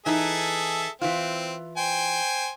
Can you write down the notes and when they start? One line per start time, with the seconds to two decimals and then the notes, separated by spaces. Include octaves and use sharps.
0.06 E3 D#4 G#4 A4 E5
1.01 E3 C4 F4
1.77 C5 G5 G#5